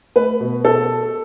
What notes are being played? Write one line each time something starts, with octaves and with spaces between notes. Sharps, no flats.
A3 B4
B2
A4